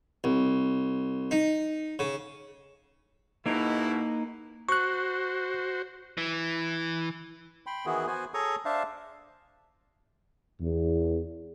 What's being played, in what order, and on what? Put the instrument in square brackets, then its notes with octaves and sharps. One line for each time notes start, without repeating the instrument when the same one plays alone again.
[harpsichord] C2
D#4
C#3
[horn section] G#2 B2 E4 [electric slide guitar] A#3 D#4
[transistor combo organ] F#4 C5 [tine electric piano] C#6 F#6
[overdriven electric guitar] E3
[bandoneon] G5 B5 C6
D#3 E3 B3 E4 F#4 G#4
B3 F#4 C5 G#5
G#4 A4 C#5 A#5 C#6 D#6
D4 C5 E5 F5 A5
[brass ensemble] E2